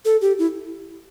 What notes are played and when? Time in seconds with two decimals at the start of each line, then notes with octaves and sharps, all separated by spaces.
0.05 A4
0.21 G4
0.39 E4